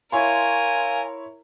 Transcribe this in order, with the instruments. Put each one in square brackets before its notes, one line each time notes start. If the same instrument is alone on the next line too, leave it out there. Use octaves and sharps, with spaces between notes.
[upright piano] E4 C#5 C6 [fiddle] A#4 [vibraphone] F5 [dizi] G#5